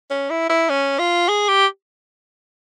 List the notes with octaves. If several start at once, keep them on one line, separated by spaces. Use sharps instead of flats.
C#4
E4
E4
C#4
F4
G#4
G4